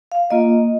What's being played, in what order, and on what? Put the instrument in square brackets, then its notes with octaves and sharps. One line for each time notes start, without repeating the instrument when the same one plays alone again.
[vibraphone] F5
A#3 F4 D#5